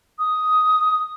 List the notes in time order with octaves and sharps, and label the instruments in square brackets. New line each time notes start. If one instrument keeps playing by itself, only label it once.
[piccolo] D#6